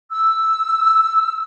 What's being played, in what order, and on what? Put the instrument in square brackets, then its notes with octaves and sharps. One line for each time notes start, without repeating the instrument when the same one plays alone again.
[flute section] E6